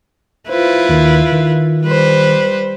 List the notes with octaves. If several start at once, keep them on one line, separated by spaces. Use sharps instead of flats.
E4 F4 B4 C5
D#2 D#3
D#3
G3 B4 C5